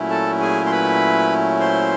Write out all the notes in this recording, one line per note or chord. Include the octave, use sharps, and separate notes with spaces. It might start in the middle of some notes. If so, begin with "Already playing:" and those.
Already playing: A#2 F#3 A3 C#4 E4
A4 A5
G#4 G#5
C6
B4 B5
C5 C6